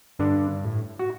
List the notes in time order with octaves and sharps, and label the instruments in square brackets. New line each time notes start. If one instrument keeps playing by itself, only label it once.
[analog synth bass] G2 [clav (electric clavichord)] D3 D4
[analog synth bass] A2
[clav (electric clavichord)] F#4